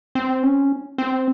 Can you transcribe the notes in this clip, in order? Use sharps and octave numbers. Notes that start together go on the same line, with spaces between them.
C4
C#4
C4